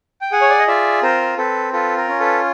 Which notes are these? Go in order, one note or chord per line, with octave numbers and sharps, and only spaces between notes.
G5
G#4 F#5 G#5
C#5
D5
D#5
F4 D5 E5
C4 A#4 C5
C4 A4 B4
F4 A4 B4
A#4
C#4
A4 B4